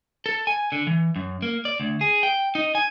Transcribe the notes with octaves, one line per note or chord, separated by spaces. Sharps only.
A4
G#5
D3
E3
F#2
A#3
D5
D2
G#4
G5
D#4
G#5